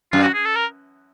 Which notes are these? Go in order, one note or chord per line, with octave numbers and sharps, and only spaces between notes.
F#2 F4
F#4
G#4
A4
A#4